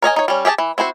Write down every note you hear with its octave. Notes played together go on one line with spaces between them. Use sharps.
A#4 C#5 D#5 G#5
D#4 C#5
G3 C#4
G4 G#4 E5 A5
E3
C4 E4 F#4 C5